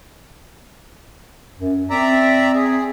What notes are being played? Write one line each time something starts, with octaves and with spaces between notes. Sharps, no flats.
F#2
C4 D5 E5 A#5
G#4